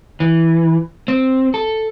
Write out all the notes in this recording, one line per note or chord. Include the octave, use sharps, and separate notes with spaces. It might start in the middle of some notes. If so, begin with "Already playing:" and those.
E3
C4
A4